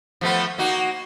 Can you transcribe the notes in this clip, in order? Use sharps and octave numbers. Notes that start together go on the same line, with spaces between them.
F3 A3 B3
A#3 D#4 F#4